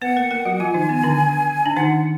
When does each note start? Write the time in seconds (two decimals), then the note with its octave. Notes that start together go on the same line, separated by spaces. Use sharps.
0.02 B3 B4 F#5
0.17 A#3 A#4
0.31 A#3 A#4
0.45 F#3 F#4
0.60 F3 F4 G#5
0.74 D#3 D#4
0.89 B3
1.03 D3 D4
1.66 D4
1.76 D#3 D#4 F#5